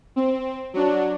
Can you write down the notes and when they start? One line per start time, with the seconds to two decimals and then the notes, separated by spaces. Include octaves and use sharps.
0.16 C4
0.74 F#3 D4